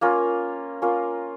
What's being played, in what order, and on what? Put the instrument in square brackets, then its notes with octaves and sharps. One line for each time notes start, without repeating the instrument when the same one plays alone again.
[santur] A#3 C#4 F4 A#4
A#3 C#4 F4 A#4